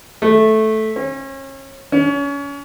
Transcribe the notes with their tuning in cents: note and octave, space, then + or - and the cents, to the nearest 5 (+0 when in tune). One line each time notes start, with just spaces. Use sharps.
A3 -10
C#4 -35
C#4 +30